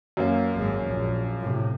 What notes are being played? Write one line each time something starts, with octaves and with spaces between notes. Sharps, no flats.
F#2 A#3
G#1 G#3
A#1
A2 C3